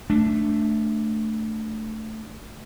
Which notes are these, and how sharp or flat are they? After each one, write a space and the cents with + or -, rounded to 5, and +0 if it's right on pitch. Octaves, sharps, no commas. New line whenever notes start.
A3 +0 D4 +0